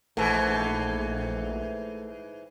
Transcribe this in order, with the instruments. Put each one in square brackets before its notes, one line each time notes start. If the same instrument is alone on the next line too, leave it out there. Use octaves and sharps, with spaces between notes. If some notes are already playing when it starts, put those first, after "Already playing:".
[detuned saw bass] A#1 [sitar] G#2 E3 [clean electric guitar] A3